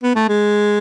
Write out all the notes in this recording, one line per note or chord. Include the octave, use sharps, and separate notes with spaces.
B3
A3
G#3